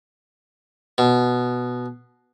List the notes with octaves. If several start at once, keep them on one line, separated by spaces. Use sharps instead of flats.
B2